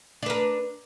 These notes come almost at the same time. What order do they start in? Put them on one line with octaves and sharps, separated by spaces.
D4 B4 A#4